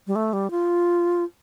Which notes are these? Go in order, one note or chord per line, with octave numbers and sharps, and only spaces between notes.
G3
A3
G3
F4